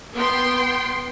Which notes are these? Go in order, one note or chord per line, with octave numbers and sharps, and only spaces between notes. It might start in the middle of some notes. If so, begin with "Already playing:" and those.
B3 G5 C6